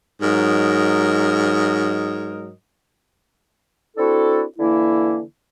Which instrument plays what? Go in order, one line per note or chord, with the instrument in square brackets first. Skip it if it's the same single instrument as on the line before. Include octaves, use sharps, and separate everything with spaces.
[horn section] G#2 F#3 A#4 D#5
[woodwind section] C4 D4 E4 F#4 A4
D3 E3 A#3 E4